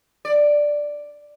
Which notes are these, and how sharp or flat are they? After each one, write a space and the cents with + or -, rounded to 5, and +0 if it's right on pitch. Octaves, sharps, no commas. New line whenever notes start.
D5 +0